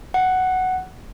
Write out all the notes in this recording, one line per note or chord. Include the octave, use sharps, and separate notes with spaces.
F#5